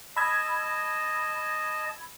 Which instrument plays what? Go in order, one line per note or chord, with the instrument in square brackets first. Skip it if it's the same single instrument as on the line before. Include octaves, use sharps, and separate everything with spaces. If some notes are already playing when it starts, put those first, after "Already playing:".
[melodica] D#5 A5 [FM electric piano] B5 E6 G#6